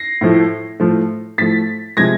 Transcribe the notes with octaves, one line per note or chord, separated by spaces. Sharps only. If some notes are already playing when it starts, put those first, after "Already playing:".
Already playing: A#6 C7
A2 F3 A3
A2 F3 A3
A2 F3 A3 A6 B6
C3 F3 G#3 G#6 A#6